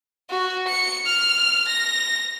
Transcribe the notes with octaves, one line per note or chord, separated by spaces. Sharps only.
F#4
C#7
F6
A#6